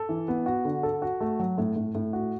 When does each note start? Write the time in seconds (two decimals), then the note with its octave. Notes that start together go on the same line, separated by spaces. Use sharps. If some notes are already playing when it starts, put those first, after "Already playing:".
Already playing: A4
0.09 E3
0.28 B3
0.46 F#4
0.65 D3
0.83 A4
1.02 F#4
1.20 A3
1.39 F#3
1.58 A2
1.76 A2
1.95 A2
2.13 F#4